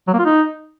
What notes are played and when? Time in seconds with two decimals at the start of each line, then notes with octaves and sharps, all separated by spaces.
0.08 F#3
0.13 A#3
0.19 F4
0.25 D#4